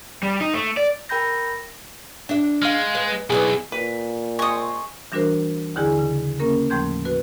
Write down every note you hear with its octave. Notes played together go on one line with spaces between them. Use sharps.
G3
D#4
A3
D5
A#4 G5 B5 G6 A#6
D4 E5
G#3 F5 F6
B4
B1 E4 G#4 B4 D5
A#2 B4
G#3 C4 C#6 D#6
E3 G3 D4 F#4 A#4 C5
D#2 D3 D#3 E4 G#4 G#5
C#3
A#3 C#4 A#4
D#2 A2 F3 A3 C6 G6
F#4 B4